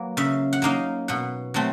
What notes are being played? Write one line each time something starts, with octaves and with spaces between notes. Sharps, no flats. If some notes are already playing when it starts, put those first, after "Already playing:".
Already playing: F#3 A#3 B4
C#3 E5
F#5
F#3 A#3 D#4 F5
B2 F#5
F#3 A3 C4